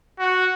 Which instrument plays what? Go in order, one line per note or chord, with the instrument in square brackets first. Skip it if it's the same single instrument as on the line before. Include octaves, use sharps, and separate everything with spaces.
[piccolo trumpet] F#4